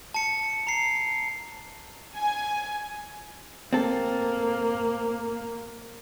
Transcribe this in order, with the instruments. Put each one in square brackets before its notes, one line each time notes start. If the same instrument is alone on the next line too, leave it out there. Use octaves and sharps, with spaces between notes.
[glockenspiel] A5 C#7
A#5 C7
[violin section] G#5
[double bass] A#3 [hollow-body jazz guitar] C4 A4